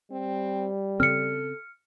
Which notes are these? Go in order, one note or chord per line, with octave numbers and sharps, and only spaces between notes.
G3 C4
C#3 C4 A4 F6 C#7